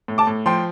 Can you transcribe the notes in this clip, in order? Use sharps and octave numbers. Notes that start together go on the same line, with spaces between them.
A2
A5 D6
A2
F3 G5 C6